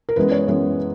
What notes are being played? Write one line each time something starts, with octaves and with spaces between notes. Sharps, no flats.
A#4
F#2 E3 G#3 B3 B4
C#5
F#2 E3 G#3 B3